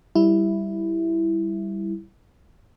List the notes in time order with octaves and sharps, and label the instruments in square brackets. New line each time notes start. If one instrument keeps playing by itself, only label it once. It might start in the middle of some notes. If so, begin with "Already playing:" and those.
[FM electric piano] G3 E4